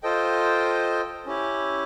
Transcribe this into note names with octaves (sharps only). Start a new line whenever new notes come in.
F4 A4 C5 D#5 G5
C#4 E4 G4